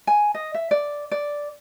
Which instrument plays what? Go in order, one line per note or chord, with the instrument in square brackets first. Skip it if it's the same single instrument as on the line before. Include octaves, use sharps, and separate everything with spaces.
[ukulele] G#5
D#5
E5
D5
D5